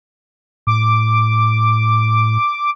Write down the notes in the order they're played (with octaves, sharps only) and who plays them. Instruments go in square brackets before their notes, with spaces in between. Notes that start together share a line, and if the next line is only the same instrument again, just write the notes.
[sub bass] A2 [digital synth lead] D6